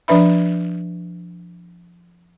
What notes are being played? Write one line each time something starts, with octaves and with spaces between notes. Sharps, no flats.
F3 D4 B4 E5 B5